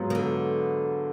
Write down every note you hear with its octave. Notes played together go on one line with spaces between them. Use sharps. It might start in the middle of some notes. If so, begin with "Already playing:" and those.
Already playing: G#2 F#3 B3 F4
D#3
D3